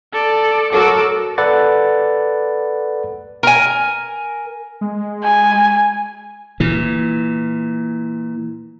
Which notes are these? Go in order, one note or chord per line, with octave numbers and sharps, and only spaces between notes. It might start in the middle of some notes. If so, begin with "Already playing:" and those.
A4 D5
F#3 F#4 A4 A#4 D6
A4 B4 D5 F#5 A6
A#4 G#5
G#3
G#5
A#2 E3